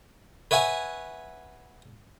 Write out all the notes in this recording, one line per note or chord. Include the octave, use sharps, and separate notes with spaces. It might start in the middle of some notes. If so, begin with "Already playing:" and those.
B4 C#5 E5 F#5 G#5